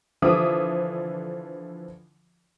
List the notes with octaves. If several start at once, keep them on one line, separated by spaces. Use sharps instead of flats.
D3 E3 F3 E5 D6 D#6